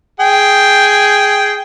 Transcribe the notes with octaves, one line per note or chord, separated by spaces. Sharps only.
G#4 G5